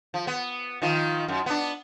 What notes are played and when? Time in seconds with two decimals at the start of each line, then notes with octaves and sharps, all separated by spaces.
0.14 F3
0.27 B3
0.82 D#3 F3 F4
1.28 F#2
1.46 B3 D4